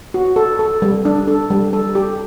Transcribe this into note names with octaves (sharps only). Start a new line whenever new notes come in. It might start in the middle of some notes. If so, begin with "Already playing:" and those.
F#4
A4
A4
G3
D4
A4
G3
A4
G4